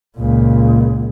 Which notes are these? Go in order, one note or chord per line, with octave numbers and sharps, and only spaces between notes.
C#2 A#2